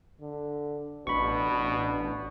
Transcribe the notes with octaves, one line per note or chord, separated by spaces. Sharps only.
D3
A1 B2 D4 B5 C#6